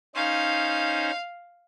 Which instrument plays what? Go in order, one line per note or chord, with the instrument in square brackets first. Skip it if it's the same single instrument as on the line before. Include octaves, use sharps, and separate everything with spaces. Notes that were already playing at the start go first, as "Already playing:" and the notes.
[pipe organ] C#4 D#4 C5 [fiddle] F5